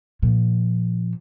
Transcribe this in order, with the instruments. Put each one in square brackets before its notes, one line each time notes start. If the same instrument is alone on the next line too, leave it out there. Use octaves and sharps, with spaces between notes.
[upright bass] A#2 F3